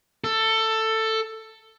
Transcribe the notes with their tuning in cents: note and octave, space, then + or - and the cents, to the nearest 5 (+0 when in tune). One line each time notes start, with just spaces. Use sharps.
A4 +15